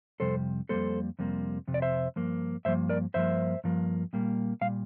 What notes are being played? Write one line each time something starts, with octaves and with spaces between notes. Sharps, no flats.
F2 C3 G3 A4 C5
F2 C3 G3 A#3 A4 C5
F2 C3 G3 A#3
F2 C3
D5
C5 E5
G2 F3 A#3
G2 F3 A#3 C5 E5
A#4 D5
G2 F3 A#3 C5 E5
G2 F3 A#3
A#2 G3 A#3
A#2 G3 F5